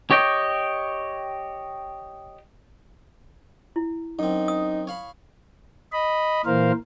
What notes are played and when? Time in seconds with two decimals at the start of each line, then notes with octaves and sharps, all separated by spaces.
0.11 G4 C#5 D#5 G5
3.76 E4
4.19 F#2 C4 D#4
4.48 D#6
4.87 C#5 F5 B5
5.92 D#5 B5
6.45 A#2 E3 A#4 C5 F5